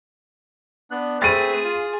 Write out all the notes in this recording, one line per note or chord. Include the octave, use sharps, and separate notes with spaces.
B3 D4 F#6
A3 C4 G#4 B4 A6 D#7
F4